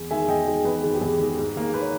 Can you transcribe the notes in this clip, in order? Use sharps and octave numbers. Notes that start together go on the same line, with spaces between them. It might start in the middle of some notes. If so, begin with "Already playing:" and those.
Already playing: E2
D#3 G#3 E5 G#5
E2 D#5 G5
D#3 G#3
E2 G#4 B4
D#3 G#3
G4
E2 G#4
D#3 G#3
G#2
D#3 A#3
B4
C#5